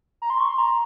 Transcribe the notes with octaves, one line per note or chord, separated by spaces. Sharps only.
A#5
C6
C#6
C6
A#5